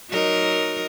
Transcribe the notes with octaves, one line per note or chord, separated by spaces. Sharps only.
F#3 D#4 A#4